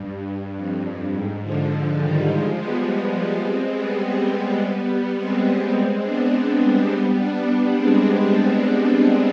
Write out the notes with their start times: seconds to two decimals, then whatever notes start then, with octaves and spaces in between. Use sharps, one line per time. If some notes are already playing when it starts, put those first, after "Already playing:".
Already playing: G2
0.56 F2
1.13 G#2
1.43 D3 F3
1.71 D3 F3
2.00 D#3 G3
2.29 F3 G#3
2.57 G3 B3
3.44 G#3 C4
3.72 G3 B3
5.17 G#3 C4
5.45 G3 B3
5.74 G#3 C4
6.04 B3 D4
6.32 G#3 C4
6.61 G3 B3
6.90 G3 B3
7.18 B3 D4
7.47 B3 D4
7.75 G#3 C4